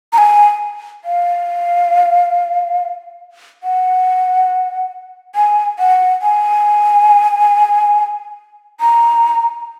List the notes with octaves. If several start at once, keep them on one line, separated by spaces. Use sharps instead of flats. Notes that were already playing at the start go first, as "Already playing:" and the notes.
A#5
G#5
F5
F#5
G#5
F#5
G#5
A#5